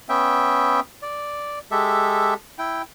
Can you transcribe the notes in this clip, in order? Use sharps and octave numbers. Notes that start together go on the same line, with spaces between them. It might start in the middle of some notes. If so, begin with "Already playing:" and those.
B3 C#4 E5 G5
D5
G#3 G4 A4 E5
E4 G5